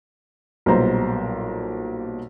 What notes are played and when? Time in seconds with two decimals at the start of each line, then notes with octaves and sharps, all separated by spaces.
0.66 B1 A#2 G3 B3 C5 A#5